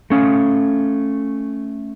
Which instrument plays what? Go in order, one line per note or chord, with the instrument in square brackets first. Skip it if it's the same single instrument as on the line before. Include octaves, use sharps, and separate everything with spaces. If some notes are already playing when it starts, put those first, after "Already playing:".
[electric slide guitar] A3 C#4 F5